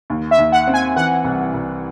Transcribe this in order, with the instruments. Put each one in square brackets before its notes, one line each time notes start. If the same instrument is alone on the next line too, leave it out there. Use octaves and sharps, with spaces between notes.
[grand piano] D#2
[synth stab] E5
[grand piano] D#2
[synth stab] F#5
[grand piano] C4
[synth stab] G#5
[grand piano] E3 [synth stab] F#5
[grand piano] C2
C2